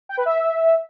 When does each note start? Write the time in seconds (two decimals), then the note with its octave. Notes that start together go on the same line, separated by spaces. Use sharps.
0.09 G5
0.17 B4
0.26 E5